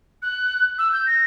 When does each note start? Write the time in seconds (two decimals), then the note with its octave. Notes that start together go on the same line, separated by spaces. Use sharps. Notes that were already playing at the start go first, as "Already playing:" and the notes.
0.22 F#6
0.78 E6
0.92 G6
1.06 A#6